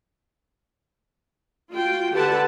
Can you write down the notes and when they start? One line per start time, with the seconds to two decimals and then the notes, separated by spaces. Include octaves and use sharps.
1.72 F4 F#4 G5
2.12 D3 G4 A4 B4 F#5 A5